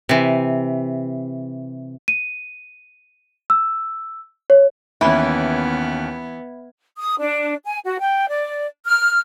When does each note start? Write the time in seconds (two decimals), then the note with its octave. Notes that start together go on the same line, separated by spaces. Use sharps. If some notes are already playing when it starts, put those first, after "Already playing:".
0.09 C3 E3
2.08 D#7
3.50 E6
4.50 C#5
5.01 D#2 E3 B3 C#4 E5 B5 G#6
6.98 D#6
7.19 D4
7.64 G#5
7.84 F#4
7.99 G5
8.28 D5
8.86 F6